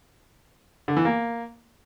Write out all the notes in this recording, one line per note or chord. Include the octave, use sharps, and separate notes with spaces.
D3
E3
A#3